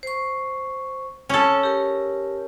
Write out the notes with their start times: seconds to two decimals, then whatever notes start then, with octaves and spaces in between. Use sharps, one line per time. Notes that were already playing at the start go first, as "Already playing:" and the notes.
0.03 C5 C#6
1.29 C#4 A4
1.63 G4 A#4